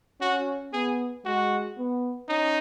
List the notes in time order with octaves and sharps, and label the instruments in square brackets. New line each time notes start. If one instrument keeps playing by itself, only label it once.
[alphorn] C#4 [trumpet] F#4
[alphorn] B3 [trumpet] G#4
[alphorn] G#3 [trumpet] F#4
[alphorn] B3
[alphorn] C#4 [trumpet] D#4